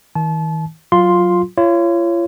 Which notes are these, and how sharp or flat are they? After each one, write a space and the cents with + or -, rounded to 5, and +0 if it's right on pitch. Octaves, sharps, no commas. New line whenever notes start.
D#3 +40 A5 -35
F#3 -5 F4 +5 C6 +0
F4 -40 C#5 +0